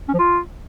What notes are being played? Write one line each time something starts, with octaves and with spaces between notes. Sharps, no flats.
C#4
F3
F4